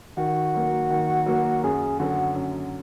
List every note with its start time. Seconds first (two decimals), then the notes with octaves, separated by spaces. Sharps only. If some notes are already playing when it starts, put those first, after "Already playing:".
0.17 D#3 F#4
0.55 F#3 A#3
0.90 D#3
1.26 F#3 A#3
1.63 F#2 G#4
1.99 D3 F#3 F#4
2.36 F#2